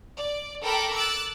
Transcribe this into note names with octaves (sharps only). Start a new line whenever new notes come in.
D5
A4 A#4 G5 A5 B5 D6
D6 E6 F#6 A6